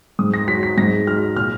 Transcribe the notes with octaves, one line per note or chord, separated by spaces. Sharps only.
G#2 D#6
A#6
F#3 B6
B6
G#2 A#6
F#3 F6
A#2 F6